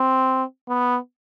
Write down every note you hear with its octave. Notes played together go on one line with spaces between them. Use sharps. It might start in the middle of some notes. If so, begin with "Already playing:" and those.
Already playing: C4
B3